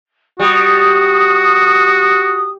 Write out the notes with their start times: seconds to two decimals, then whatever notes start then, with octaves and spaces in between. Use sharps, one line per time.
0.40 G3 F#4 D#6